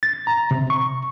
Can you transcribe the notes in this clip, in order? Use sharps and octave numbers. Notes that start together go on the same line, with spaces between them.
A6
A#5
C3
C#6